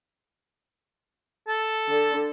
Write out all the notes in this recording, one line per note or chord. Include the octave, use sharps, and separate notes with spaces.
A4
D3